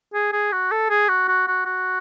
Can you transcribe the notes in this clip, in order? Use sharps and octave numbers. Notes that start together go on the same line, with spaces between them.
G#4
G#4
F#4
A4
G#4
F#4
F#4
F#4
F#4